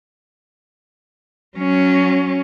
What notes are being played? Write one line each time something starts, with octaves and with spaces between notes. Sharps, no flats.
F#3 C#4